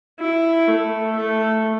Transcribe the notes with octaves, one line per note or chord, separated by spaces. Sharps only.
E4
A3
A3